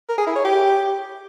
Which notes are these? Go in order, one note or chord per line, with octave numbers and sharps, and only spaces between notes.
A#4
G#4
E4
C#5
G4